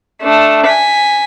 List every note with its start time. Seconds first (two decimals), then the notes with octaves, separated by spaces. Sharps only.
0.22 A3 D4
0.66 G#5 B6